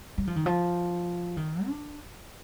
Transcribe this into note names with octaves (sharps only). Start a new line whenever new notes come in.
G3
F3
D#3
F3
D#3
D4